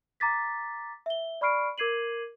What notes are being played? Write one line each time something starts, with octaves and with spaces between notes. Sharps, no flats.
A#5 D6 A6 B6
E5 G7
D5 B5 C#6 F6 C7 D7
A#4 D6 G#6 C7 D#7 F#7